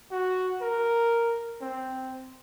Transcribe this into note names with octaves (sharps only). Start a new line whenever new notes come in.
F#4
A#4
C4